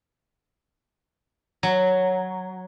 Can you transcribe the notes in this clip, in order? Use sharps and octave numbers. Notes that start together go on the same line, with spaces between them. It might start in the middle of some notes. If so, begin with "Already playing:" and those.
F#3